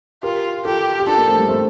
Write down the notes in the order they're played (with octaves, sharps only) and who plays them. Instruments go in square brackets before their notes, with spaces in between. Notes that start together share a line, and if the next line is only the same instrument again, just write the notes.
[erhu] F4 [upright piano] G4 A#4
[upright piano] F4 A4 [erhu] G4
[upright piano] G4
[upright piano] D4 F4 [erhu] A4
[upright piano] A#3 D4
A3 C4
G3 A#3
A3 C4